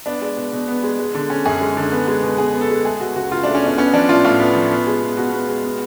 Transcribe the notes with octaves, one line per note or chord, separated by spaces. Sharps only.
B3 D4
G#3
B2
B2
B3
G#3
G#3
D3
C#4
F#2 G#4
G#3
D3
B3
G#3
B2
B2 G#4
B3
A4
G#3
A3 G#4
B2 F#4
C#2 F#4
C#2 F4
D4
A3
C#4
B2 D4
B3 C#4
F3 D4
A2 F4
A2 F4
B3
F3
B3
G#3
B2
B2 F#4
B3
G#3
B3